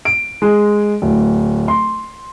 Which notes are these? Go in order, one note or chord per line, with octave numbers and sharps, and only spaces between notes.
D7
G#3
D1
C6